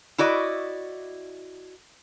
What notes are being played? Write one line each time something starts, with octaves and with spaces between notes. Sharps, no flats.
E4 F#4 D5 D#5